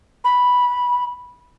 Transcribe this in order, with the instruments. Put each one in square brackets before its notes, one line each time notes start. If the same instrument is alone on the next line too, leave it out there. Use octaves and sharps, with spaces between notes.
[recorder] B5